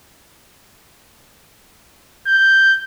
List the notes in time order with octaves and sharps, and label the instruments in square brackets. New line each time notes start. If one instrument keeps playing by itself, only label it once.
[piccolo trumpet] G6